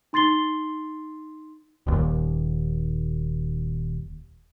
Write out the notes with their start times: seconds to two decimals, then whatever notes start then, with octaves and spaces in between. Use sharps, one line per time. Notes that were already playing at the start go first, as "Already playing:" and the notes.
0.13 D#4 C6 A6 C7 G7
1.87 D#1 D#2